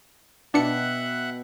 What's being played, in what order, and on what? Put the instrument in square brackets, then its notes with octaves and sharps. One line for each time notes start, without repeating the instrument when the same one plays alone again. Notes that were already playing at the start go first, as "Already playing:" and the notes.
[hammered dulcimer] B2 G5 [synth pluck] D4 C#7 [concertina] E5 F#5 F#6